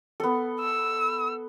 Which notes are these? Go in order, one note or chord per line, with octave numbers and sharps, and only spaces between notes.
B3 A4
E6